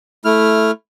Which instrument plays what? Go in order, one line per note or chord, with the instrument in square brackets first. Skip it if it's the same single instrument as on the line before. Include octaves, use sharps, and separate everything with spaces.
[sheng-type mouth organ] A3 E4 F6